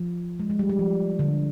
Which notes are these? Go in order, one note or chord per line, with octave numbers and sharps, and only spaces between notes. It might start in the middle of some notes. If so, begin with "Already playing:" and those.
Already playing: F3
G#3
G#3
G3
G3
F3
D3